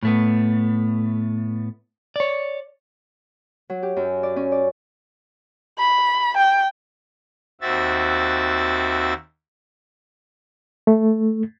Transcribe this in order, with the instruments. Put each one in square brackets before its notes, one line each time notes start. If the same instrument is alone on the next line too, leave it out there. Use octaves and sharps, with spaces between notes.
[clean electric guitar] A2 A3 B3
C#5 D5
[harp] F#3
G4
F#2
D5
C#4
D5
[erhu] B5
G5
[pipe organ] D#2 C4 F#4 E5 A6
[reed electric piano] A3